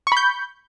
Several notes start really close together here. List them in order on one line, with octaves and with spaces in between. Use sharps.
C#6 B5 G6